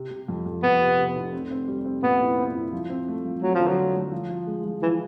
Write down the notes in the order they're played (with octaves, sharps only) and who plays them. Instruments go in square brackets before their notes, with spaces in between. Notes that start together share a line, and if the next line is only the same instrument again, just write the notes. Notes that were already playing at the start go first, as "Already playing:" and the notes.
Already playing: [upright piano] C3
C3
F2
F2
[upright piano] F2 [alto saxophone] B3
[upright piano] C3
C3
F1
C4
C4
G3
C4
[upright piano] A#2 [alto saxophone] B3
[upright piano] E4
C4
E4
F3
C4
A3
F3
[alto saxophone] F#3 [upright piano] A3
[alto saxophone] F3
[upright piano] D3
[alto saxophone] F#3
[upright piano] A3
A3
F3
F3
G#3
F3
[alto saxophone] E3 [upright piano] F3